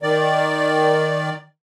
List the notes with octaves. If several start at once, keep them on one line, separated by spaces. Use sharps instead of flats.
D#3 D5